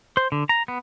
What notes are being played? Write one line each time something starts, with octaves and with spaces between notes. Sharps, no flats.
C5
D3
A#5
B3